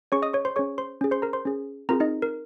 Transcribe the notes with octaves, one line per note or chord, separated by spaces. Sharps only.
C#4 G#4 C#5 C#6
D#5 D#6
C#5 C#6
C5 C6
C#4 G#4 C#5 C#6
C5 C6
C#4 G#4
C5 C6
A#4 A#5
C5 C6
C#4 G#4
C4 F4 G#4 A#4 A#5
D#4 D#5
A#4